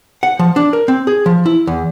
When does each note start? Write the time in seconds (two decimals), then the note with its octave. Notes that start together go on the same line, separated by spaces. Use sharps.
0.23 F#5
0.39 F3
0.56 D4
0.73 A#4
0.88 C4
1.07 G#4
1.26 F3
1.46 E4
1.67 E2